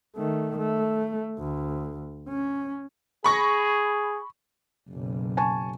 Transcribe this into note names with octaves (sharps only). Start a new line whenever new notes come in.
D#3 A3
A3
D2
C#4
G#4 B5 C#6 A#6
F#1 B1
G#5 A5 C#6